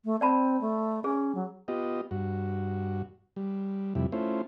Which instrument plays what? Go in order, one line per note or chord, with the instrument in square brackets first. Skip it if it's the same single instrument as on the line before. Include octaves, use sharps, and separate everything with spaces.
[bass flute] A3
[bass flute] C4 [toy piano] D5 A5 B5
[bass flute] A3
[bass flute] C#4 [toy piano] G#4
[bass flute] F#3
[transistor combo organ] B3 F4 G4 D#5
G2 F#4
G3
F2 C3 G3 E4
A3 C#4 E4 F4 C5